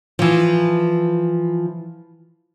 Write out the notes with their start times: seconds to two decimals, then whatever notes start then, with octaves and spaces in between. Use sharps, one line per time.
0.19 E3 F3